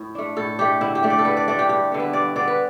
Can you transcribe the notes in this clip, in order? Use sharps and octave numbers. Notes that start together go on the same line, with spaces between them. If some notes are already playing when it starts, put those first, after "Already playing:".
Already playing: A2
A3 D4
A2 A4
A3 D4 G4
D3 E4
G4
A3 D4
D5
A4
D3 B4
D5
A3 D4 D5
G4
G2 G4
D3 B3
B4
G2 D5
D3 B3 D5
B4